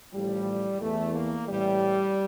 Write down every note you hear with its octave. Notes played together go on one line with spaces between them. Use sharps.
A1 A2 F3 G3
E2 E3 A3
A#3
A1 A2 E3 G3